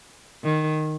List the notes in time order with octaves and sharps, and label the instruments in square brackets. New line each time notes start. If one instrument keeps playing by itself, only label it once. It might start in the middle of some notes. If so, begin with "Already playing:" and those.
[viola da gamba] D#3